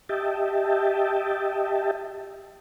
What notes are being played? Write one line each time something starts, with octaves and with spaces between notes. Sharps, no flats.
G4 D#5 E5 G5 A5